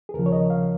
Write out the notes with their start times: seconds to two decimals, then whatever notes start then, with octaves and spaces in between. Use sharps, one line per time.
0.09 G#4
0.14 D#2 C#3 F3 A#4
0.26 C#5
0.32 D#5
0.50 F5